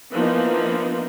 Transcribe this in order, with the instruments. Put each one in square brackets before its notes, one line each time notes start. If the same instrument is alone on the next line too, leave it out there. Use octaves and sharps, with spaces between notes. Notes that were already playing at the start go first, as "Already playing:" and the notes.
[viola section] E3 F3 A#3 B3 D4 D#4